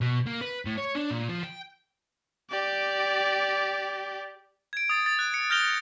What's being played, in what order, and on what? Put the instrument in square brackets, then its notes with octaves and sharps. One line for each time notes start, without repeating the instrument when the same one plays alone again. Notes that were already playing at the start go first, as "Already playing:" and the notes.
[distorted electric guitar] B2
A#3
B4
A2
C#5
D4
A#2
F3
G5
[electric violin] G4 D5
[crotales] G#6 D7
D#6 A6
A6
F#6
C#7
F6 G6 A#6 F7 G7